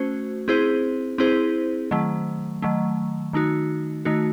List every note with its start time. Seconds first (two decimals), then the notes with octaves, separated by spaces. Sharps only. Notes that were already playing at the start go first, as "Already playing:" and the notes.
Already playing: A3 C#4 F#4 C5
0.48 C4 E4 G#4 C5
1.18 C4 E4 G#4 C5
1.91 D#3 F#3 A3
2.62 D#3 F#3 A3
3.33 D#3 A3 D#4 F#4
4.05 D#3 A3 D#4 F#4